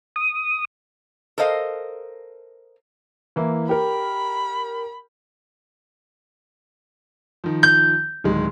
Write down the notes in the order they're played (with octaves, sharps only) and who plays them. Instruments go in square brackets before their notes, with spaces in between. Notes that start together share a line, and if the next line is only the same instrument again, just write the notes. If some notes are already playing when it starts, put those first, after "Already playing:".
[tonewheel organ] D#6
[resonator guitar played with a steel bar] A4 A#4 C5 D#5 F5
[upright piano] E3 A#3 E4
[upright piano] G4 A#4 [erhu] B5
[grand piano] D#3 F3
[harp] G6
[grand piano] D1 D#3 G#3